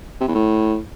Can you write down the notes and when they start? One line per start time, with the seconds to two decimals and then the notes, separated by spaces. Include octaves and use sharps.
0.21 C3
0.28 E2
0.35 A2